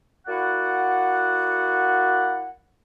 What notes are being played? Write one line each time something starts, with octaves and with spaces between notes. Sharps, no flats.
A#3 E4 F#4 D5 F#5